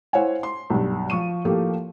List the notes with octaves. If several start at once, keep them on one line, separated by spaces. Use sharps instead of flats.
E4 C5 C#5 F5 F#5 G#5
C6
B1 G2
F3 C#6 D#7
A2 F3 A3 A#3 G4